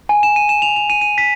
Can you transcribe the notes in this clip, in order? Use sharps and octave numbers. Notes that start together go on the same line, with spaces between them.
G#5
E7
D#7
E7
F7
F7
D#7
D#7
B6